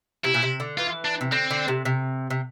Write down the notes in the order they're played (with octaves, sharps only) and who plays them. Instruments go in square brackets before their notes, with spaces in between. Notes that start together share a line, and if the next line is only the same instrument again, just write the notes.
[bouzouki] C3 [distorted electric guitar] E4
[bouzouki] A#2
C3
D3
[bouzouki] E3 [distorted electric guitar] F4
[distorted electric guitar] D4
[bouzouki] C3
[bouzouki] D3 [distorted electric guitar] C4
[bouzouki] D3
C3
C3
C3